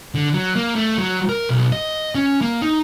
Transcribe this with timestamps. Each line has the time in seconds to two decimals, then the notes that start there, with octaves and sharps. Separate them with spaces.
0.15 D3
0.34 F#3
0.56 A#3
0.76 A3
0.98 F#3
1.29 A#4
1.49 B1
1.72 D#5
2.15 C#4
2.41 A#3
2.62 D#4